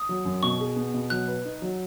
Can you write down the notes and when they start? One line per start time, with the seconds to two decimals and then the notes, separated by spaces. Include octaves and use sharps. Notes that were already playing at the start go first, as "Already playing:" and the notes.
Already playing: D#6
0.09 F#3
0.25 F#2
0.43 B2 C#6
0.60 G#4
0.76 B3
0.94 B2
1.10 F#3 F#6
1.28 B4
1.45 D#4
1.62 F#3